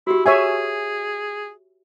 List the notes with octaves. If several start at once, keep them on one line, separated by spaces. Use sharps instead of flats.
E4 F#4 G4
G4 G#4 C#5 E5 G#5